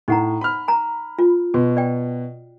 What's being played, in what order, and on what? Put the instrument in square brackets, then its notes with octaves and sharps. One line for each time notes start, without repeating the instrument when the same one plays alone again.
[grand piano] A2 [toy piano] D#4 F#5 A#5
[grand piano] B5 F6
[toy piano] A5 A#5
F4
[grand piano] B2 [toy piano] F#4
[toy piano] D5 G5